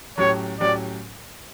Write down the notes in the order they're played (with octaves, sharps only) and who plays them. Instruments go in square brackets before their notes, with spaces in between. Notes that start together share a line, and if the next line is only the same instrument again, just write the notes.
[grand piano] A2 F#3 C#4 G4 [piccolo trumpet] C#5
[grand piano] A2 F#3 C#4 G4 [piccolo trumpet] D5